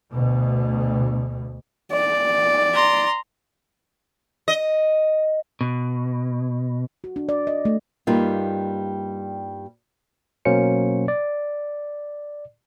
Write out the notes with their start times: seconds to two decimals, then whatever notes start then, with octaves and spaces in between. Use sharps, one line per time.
0.11 D2 B2
1.93 D5
2.74 A#5 C6
4.48 D#5
5.61 B2
7.04 F#4
7.16 D4
7.29 D5
7.47 D#5
7.65 A3
8.07 G2 G3 A#3 D#4 F4
10.45 B2 F#3 A#3 C#4 C5 C#7
11.08 D5